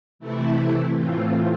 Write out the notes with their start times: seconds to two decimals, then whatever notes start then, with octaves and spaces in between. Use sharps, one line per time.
0.19 C3 E3 A3 E4
0.93 A2 E3 A3 C4 F4